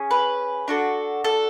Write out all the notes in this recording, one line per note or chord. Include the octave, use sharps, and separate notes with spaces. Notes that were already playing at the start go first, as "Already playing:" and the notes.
Already playing: C#4 G#4
B4
D4 F#4 A4
A4